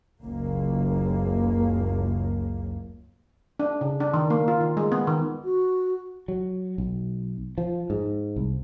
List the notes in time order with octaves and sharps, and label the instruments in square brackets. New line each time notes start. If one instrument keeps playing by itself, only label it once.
[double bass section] F#1 C#2 A#3
[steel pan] D4
C#3
D4
D#3
A#3
F4
D#3
G#3
B3
D#3
[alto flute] F#4
[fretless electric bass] F#3
B1
F3
G#2
C2